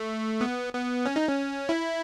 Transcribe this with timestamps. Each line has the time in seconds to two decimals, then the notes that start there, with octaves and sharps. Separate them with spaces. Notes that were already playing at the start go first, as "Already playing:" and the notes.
Already playing: A3
0.41 B3
0.73 B3
1.06 C#4
1.16 D#4
1.28 C#4
1.69 E4